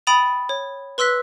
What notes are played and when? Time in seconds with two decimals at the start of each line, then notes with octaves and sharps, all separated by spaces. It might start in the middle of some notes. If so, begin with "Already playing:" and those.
0.07 G5 B5 D#6 A6 D#7 F7
0.49 C#5
0.98 B4 C6 E6 F#6 B6